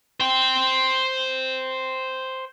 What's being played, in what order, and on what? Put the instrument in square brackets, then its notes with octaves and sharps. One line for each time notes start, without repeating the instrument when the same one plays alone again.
[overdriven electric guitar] C5 G5